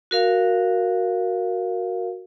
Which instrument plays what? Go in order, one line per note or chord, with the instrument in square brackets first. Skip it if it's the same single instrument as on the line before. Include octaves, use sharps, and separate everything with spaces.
[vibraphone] F#4 A#4 F5